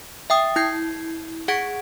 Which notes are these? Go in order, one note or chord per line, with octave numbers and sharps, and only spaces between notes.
E5 G5 D#6
E4 G6 G#6 C7
G#4 F#5 G#6 B6 D7